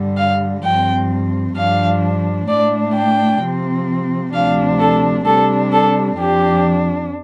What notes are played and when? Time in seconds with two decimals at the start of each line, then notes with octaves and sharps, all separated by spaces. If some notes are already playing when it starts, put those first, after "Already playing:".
Already playing: G2 D3 G3
0.17 F5
0.63 G2 F3 C4 G5
1.55 G2 F3 D4 F5
2.48 A2 A3 D4 D5
2.95 G5
3.40 C3 F3 C4
4.33 D2 C3 F3 D4 F5
4.79 A4
5.26 C3 G3 D4 A4
5.72 A4
6.17 F2 F3 D4 G4